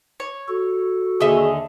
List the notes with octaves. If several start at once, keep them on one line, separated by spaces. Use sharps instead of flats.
C#5
F#4 A4
D#2 D3 G#4 D#5 E5